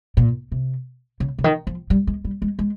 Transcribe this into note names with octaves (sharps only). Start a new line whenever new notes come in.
A#2
C3
C#3
C#3
D#3
F3
G3
G#3
G3
G#3
G#3